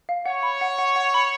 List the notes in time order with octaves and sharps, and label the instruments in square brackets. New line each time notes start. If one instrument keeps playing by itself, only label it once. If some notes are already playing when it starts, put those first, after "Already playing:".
[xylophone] F5
[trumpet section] C#5 [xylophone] F#5
[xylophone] B5
F#5
F#5
F#5
B5